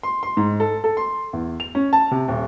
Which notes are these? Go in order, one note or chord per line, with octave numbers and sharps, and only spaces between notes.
C6
C6
G#2
A4
A4
C6
E2
F7
C#4
A5
C3
D#1